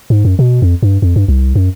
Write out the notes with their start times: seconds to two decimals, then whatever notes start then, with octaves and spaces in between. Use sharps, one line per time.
0.10 G#2
0.25 F#2
0.39 B2
0.62 F2
0.83 G2
1.02 F2
1.16 G2
1.28 C2
1.55 F#2